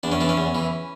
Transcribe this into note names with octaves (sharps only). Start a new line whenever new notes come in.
E2 D4
C#4
E3 D4
C#4
E2
E3